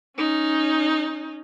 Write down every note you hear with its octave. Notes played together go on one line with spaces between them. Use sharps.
C#4 D#4